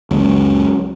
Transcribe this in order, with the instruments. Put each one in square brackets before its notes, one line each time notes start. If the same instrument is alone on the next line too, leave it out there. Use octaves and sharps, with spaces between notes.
[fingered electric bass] F#1 C#2 G#3 [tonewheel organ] F#3 C#4